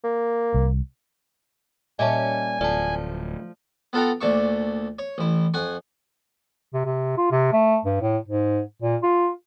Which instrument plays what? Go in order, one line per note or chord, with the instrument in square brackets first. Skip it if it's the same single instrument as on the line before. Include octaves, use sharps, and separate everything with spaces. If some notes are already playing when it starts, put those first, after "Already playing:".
[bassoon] A#3
[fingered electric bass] C2
[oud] A#2 G3 C#4 [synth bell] D#5 E5 A5 [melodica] G#5
[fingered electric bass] D1 [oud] F3 A3 [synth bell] D5 A5
[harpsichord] B3 F4 A4 F#5 G5 A#5
D2 A#2 D4 E5 C#6
C#5
A1 E4
F2 F#5 G#5 C#6
[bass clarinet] C3
C3
F4
C3
A3
G2
A2
G#2
A#2
F4